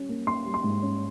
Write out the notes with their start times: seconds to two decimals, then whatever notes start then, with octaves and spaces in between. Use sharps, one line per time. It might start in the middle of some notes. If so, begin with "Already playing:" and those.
Already playing: G3 C#4
0.09 A#3
0.27 A#3 C6
0.45 G3
0.54 C6
0.64 G#2
0.82 C#4